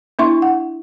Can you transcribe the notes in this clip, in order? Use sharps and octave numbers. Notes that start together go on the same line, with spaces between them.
B3 D4 E4 E5 C6 C#6
F#5